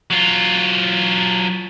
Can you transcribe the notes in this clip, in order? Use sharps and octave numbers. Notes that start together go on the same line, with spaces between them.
F#3 F4